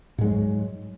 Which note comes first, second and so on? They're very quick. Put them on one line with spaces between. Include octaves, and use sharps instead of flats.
G#2 G#3 F#3